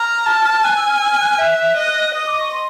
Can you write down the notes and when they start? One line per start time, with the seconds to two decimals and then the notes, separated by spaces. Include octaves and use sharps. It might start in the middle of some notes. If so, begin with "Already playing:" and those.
Already playing: A#5 F6
0.26 A5
0.64 G#5 F#6
0.77 E6
0.89 F6
1.01 E6
1.11 F6
1.21 F#6
1.30 F6
1.39 E5 F#6
1.77 D#5
2.14 D#5 D#6
2.26 D6
2.40 C#6
2.52 C6